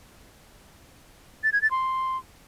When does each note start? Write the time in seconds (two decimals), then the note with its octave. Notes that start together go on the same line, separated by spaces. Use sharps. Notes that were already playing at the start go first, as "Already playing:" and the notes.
1.44 A6
1.53 G#6
1.62 A6
1.71 C6